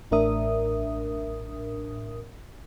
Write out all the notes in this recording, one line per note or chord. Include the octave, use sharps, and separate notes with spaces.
A1 A2 D4 A#4 E5 D#6